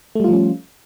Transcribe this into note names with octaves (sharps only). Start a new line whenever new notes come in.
F3 G3 A3 C#4 F4